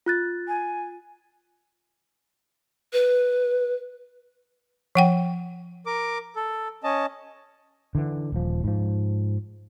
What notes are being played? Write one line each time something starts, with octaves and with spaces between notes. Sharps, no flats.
F4 F#6 A6
G#5
B4
F3 F#5 G5
A#4 D6
A4
C#4 D#5 A5
D3 E3
D#1 F3
G#2 F3